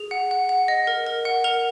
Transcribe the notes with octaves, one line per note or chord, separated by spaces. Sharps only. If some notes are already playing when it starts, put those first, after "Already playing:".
Already playing: G#4 F7
F#5
F#5
F#5
D#5
A#4
A#4
F#5
A#4 F7